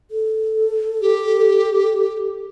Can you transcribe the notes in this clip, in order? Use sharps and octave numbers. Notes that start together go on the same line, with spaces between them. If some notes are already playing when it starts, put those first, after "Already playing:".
A4
G4